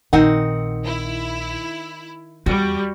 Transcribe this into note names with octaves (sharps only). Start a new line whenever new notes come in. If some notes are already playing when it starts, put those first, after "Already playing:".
A#1 D#3 C4 D#4 F#5
E4
E2 G3 F#4